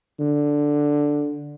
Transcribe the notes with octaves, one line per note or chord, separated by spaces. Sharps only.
D3